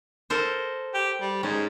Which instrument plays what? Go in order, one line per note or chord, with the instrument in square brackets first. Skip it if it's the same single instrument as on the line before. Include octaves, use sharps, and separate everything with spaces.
[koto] A4 A#4 C5
[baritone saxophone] G4
G3
[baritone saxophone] G#2 [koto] C#4